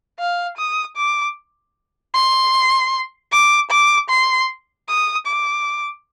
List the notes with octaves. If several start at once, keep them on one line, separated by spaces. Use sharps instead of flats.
F5
D#6
D6
C6
D6
D6
C6
D#6
D6